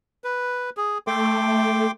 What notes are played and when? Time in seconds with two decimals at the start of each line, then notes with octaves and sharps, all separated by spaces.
0.24 B4
0.77 G#4
1.07 A3 G5 C6 D6